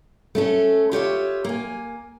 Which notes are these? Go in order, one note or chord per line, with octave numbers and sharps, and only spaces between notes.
A3 C#4 A4
F4 G4 C#5 E5
A#3 G#5